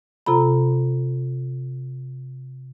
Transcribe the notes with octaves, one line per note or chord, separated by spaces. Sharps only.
C3 F4 A4 A#5 B5